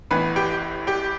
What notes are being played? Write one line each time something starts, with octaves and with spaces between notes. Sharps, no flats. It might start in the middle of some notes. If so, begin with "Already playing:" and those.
A1 A2 E3 B3 B4 B5
G4 G5
G4 G5